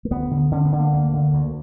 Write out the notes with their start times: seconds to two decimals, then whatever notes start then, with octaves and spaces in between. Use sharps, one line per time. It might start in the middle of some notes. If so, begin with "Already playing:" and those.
0.05 A#3
0.11 D2 B3
0.31 D3
0.51 D3 C#4
0.65 B3
0.72 D3
0.79 A#3
0.93 D2 A#3
1.14 D3
1.33 D2